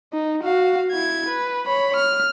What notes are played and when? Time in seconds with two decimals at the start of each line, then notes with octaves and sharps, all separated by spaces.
0.13 D#4
0.44 F#4 F5
0.92 E4 G#6
1.29 B4
1.67 C#5 B5
1.96 F6